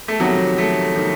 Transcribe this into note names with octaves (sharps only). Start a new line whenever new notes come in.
A3
F2 C3 D#3 F#3
A3
C3 D#3